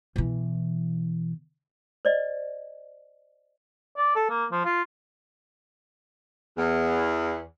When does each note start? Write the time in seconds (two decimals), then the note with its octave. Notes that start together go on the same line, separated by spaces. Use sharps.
0.16 B2 E3
2.05 C5 D5 D#5
3.97 D5
4.15 A4
4.30 A#3
4.52 F3
4.65 F4
6.57 E2